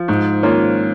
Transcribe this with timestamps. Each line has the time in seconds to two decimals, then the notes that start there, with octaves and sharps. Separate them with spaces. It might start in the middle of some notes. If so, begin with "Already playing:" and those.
Already playing: F3
0.08 G#2
0.42 D#3 A#3 C#4 F4